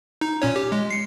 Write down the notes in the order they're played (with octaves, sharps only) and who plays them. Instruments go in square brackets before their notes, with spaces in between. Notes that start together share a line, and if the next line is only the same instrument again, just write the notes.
[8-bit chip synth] D#4
A#2 C#4 C#5
G4
G#3
C7 C#7